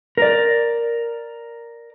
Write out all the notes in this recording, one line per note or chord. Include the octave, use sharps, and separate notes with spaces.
A#4 D5